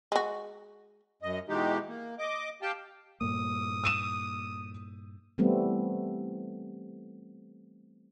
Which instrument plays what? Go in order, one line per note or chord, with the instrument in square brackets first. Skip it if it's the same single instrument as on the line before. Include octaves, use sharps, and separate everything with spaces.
[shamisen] G#3 F#4
[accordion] F#2 D#5
B2 E3 G#3 D#4 G4
A#3
D#5 D6
G4 F5 G5 A5
[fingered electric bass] G2 A#2 A#3 [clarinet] D#6
[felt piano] E6 D#7 E7
[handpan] E3 G3 A3 B3 C4